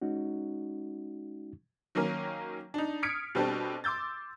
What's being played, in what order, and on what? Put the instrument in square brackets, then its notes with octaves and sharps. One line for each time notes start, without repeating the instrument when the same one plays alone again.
[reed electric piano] G#3 C#4 D#4 F#4
[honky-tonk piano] D#3 F#3 A#3 C#4 A#4
D4 D#4
D#6 F6 G#6 B6 C#7 D7
B2 G3 C4 D4 G4 A4
C6 D6 E6 G6 A6